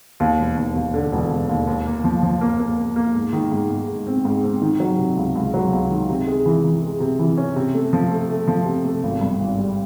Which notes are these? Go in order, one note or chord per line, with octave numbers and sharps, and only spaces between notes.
D#2
E1
D#2
D#2
D3
E1
E1
D#2
D#2
A#3
F3
F3
A#3
A#3
A#3
A#3
G#2
D#3
G#2
G#2
G#2
C4
G#2
C4
D#3
F#3
C3
C#2
C#2
F#3
C#2
D#3
C3
G#3
E3
E3
G#3
C3
E3
C#4
C3
A3
F3
A3
A3
F3
C3
A3
G#1
G2
G#1
G3